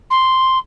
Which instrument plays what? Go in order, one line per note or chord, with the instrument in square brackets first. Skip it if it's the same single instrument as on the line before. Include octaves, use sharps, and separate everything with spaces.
[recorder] C6